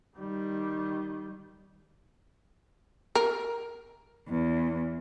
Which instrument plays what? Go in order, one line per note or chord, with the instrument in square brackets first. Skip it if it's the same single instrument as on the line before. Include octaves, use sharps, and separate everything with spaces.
[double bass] D#3 G3
[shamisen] A#4
[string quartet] E2